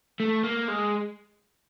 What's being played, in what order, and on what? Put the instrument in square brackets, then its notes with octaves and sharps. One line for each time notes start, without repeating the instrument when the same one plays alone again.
[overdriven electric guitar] A3
A#3
G#3